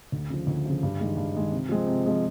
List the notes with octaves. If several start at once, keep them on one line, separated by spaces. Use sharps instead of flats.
D2
C#3 F3
D2
C#3 F3
G2
D#3 G#3
G2
D#3 G#3
C3
F3 G#3 C4
C3
F3 G#3 C4